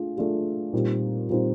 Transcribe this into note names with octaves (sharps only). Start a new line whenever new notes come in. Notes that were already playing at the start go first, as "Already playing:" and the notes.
Already playing: A3 D4 F4 G#4
A3 D4 F4 G#4
A#2 G3 C4 D#4
A#2 G3 C4 D#4